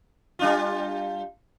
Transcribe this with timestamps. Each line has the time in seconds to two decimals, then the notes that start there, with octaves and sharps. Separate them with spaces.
0.39 G3 D4 F4